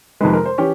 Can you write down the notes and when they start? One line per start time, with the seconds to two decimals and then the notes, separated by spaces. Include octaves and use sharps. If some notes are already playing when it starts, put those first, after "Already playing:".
0.21 F2 C3 D#3 G#3 B4
0.33 A#4
0.45 C5
0.58 E3 C#4 G4